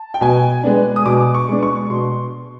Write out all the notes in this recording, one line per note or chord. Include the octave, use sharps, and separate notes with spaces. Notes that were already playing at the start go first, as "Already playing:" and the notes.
Already playing: A5
G5
B2 G#5
G#3 B3 D4
D#6
B2 D6
C#6
G#3 B3 D4
C#6
B2 C6